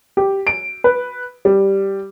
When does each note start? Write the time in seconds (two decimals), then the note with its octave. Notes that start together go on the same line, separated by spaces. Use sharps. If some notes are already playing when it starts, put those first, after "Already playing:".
0.17 G4
0.47 D7
0.84 B4
1.45 G3